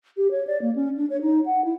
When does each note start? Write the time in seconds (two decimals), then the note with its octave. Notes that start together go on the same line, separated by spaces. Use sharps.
0.17 G4
0.31 C#5
0.47 D5
0.62 A#3
0.75 C#4
0.97 D4
1.10 C#5
1.22 D#4
1.46 F#5
1.65 E4